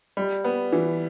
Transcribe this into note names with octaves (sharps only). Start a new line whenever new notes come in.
G3
B3
E3